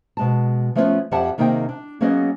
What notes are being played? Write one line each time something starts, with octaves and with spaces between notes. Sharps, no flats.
B2 G#3 A5
F3 A3 B3 C#4 D#4 F4
F2 F3 G4 E5 F#5 A5
C3 D#3 A#3 D#4 G#4 G5
D4
F#3 A#3 B3 C#4 G#4 D#5